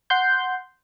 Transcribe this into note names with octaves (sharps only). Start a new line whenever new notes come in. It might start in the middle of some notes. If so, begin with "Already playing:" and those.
F#5 C6 G6